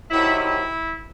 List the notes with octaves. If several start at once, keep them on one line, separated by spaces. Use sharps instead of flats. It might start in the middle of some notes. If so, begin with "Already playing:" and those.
C3 D#3 F#3 E4
E4